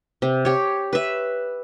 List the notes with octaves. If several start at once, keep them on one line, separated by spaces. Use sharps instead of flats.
C3
G4 C#5
B4 E5